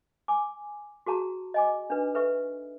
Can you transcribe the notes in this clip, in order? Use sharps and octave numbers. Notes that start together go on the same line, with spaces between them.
G#5 D6
F#4 G#4 A5 A#5
D#5 G#5 D6
D4 D#4 B4
A4 B4 E5 C#6